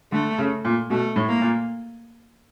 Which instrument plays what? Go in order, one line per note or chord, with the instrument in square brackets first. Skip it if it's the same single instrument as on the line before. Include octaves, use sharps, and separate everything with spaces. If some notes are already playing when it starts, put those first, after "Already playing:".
[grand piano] D3 [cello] A3
[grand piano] C#3
A#2
[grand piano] B2 [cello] A3
[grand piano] A2
[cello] A#3
[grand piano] A#2